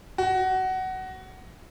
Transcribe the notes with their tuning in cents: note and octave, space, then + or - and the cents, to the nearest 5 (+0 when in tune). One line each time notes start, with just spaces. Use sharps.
F#4 +20